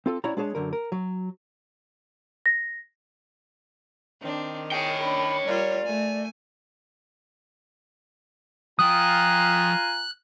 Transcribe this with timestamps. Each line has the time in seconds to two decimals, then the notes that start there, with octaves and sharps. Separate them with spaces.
0.06 C4 F4 A4
0.24 C#4 E4 F#4 C#5 D5 A#5
0.37 G#3 D4 G#4 C#5 A5
0.55 F#2 D3 A#4
0.73 A#4
0.92 F#3
2.46 A#6
4.21 D#3 C4 D4
4.72 G#4 C#5 G5
5.02 C#4 D4 B5
5.46 G3 F4 A#4 D5
5.86 A3 G#5
8.79 F3 F4 G5 G#5 A#5 D#6 F#6